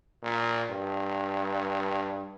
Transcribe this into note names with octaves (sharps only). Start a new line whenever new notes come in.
A#2
G2